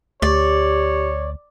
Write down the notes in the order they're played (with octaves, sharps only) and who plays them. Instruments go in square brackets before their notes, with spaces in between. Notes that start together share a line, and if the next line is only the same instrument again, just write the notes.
[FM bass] D2 [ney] G4 [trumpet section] C#5 [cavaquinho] D5